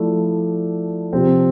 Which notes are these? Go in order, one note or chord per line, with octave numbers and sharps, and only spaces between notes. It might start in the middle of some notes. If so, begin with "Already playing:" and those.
Already playing: F3 A3 E4 A4 D5
C3 F3 C4